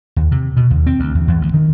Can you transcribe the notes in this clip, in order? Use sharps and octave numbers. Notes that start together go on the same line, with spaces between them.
D#2
C3
B2
D#2
C4
D2
E2
E2
D2
D#3